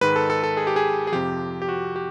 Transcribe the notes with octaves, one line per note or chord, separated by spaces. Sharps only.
G#2 D#3 G#3 B4
A4
A4
A4
G#4
G4
G#4
G#4
F2 C3 F3 G4
G4
F#4
G4